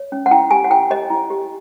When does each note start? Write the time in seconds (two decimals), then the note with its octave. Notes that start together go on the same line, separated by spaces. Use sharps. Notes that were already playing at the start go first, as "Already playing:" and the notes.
Already playing: C#5
0.12 C#4
0.26 F#5
0.31 E4 G5
0.51 G4 G#5
0.64 F#5
0.70 E4 G5
0.90 G4 D#5
1.10 E4
1.30 G4